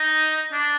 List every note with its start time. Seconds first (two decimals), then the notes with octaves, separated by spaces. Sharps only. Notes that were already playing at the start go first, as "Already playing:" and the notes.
Already playing: D#4
0.53 D4